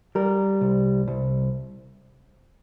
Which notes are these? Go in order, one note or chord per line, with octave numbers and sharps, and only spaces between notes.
G3 A#4
C2
C2